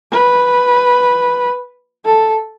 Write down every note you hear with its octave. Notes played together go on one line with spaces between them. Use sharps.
B4
A4